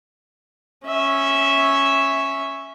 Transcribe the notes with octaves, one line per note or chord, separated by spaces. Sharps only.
C#4 E5